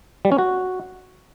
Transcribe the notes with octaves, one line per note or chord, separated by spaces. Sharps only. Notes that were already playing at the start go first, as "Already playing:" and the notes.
G3
C#4
F#4